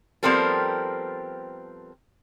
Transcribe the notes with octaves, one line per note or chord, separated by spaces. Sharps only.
F3 G3 B3 C4 A4 A#4